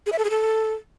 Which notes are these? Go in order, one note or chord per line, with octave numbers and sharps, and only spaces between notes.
G#4
E5
A4
G#4
A4